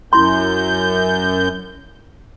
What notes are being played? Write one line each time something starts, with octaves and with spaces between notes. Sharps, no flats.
F#2 E4 C6 G6